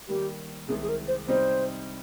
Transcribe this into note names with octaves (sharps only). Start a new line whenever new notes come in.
D#3 G3 A#3 G4
C2 C3 D#3 G#3 C4 G#4
G#4
A#4
C5
C3 G3 C4 D#4 C5